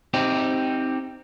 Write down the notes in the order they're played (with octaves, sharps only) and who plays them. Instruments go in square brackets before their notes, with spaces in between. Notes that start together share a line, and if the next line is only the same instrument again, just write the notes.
[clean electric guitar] C4 D#4 G4